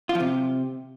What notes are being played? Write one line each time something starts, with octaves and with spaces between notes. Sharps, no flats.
F4
F3
C3